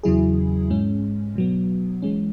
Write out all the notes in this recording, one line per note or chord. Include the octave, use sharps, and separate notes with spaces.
E2 C#3 F#3 E4 G#4
G#2 G#3 C#4
B2 F#3 B3
E3 G#3 C#4